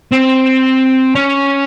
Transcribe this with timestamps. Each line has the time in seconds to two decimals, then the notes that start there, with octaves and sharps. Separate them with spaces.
0.12 C4
1.15 C#4